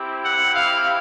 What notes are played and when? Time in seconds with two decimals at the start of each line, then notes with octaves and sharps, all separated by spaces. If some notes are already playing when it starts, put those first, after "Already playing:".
Already playing: C4 E4 G4
0.24 F#5
0.54 F5